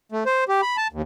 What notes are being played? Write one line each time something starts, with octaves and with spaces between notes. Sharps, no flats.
A3
C5
G4
B5
A5
D#2